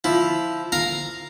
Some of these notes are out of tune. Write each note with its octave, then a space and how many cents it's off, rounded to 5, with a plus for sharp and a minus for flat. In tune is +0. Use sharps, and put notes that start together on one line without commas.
F3 -5 E4 +0
A#4 +0 F5 +0 A#5 +0